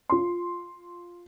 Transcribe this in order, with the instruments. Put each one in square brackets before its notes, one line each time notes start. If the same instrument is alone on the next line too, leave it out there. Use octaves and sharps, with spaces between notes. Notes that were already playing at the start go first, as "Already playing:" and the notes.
[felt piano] F4 C6